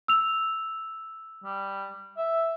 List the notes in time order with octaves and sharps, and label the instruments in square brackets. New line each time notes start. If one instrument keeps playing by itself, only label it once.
[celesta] E6 F7
[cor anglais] G3
E5